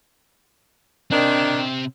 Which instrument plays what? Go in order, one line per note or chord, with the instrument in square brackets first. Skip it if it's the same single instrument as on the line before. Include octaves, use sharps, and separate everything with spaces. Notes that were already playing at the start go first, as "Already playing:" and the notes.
[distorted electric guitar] C3 C4 [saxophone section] D#3 D4